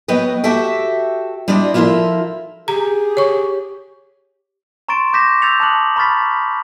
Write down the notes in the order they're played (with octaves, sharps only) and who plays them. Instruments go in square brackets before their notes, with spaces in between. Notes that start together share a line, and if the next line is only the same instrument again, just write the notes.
[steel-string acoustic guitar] F#3 B3 B4 D#5 G5
F#4 G4 A4 E5 G5
G3 D4 E4 C5 D5 D#5
F3 E4 F4 A4 A#4 E5
[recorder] G4 [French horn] G#4 [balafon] A#5
[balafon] C#5 C#6
[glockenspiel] A#5 C6 C#6 A6 D7 E7
C#6 D6 G6 A#6 B6 E7
E6 G6 A6 B6 C#7 F7
A5 A#5 D6 D#6 F#6 F#7
A#5 B5 C#6 F6 A6 B6